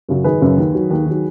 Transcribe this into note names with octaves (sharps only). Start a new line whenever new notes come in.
F#2 C#3 F#3
G#1 G#4 B4
F#2 C#3 F#3
D#2
D#3 F#3
D#2
D#3 F#3